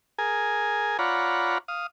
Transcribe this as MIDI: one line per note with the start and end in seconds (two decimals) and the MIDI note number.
0.18 0.97 68
0.18 0.97 70
0.18 0.97 80
0.99 1.58 65
0.99 1.58 73
0.99 1.58 74
0.99 1.58 78
0.99 1.58 82
0.99 1.58 83
1.68 1.87 77
1.68 1.87 87